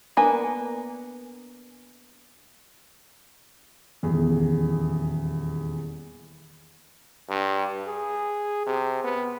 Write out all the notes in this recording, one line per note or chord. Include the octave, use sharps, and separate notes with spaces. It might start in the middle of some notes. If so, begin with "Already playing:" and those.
A#3 B3 D4 G#5
D#1 E2 G#4
G2
G#4
C3
B3